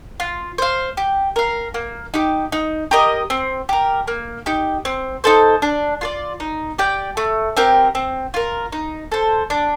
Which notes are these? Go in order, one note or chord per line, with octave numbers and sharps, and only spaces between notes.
F4
C5 F5
G4
A#4 F5
A#3
D#4 G4
D#4
G4 A#4 D#5
C4
G4 A#4
A#3
D#4 G4
C4
D#4 A4 C5
D4
F4 A4 D5
D#4
G4 D5 G5
A3
C4 G4 A#4
C4
F4 A#4
D#4
A4 C5
D4